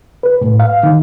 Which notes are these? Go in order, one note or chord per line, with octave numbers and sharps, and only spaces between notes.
B4
A2
F5
D#3